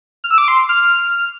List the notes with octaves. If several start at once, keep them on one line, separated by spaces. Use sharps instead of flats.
F6
E6
D6
C6
F6